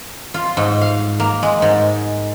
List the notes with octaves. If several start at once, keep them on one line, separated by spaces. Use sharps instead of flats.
F4
G#2
F5
A#3
G#3
G#2